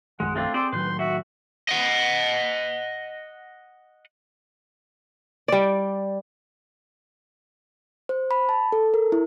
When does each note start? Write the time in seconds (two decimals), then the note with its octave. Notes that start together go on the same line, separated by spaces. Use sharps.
0.20 A#1 F#2 D#3 G#3 F#5
0.35 A3 C4 D4 F4
0.54 C4 G#4 A4 C5 D5
0.73 A2 D#3 F#3 B4 C6 G6
0.99 F#4 E5
1.69 D#5 F#5
5.48 G3 D5
8.09 C5
8.31 B5
8.49 A5
8.72 A4
8.94 A#4
9.12 E4